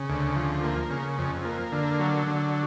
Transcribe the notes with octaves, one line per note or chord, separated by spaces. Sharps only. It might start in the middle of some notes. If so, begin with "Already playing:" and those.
Already playing: C#3
D2
F3
A#3
C#3
F2
A#3
D3
F#3
D3